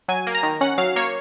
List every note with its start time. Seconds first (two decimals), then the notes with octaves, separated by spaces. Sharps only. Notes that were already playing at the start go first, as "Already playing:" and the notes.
0.08 F#3 G#5
0.27 A#3
0.35 A#5
0.43 D#3
0.61 C#4 F#5
0.78 F#3 F5
0.96 A#3 C#5